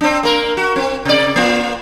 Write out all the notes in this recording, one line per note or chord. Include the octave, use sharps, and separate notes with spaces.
C4 D4
A#3 A#4
F#4
C4
C3 D5
A#3 F4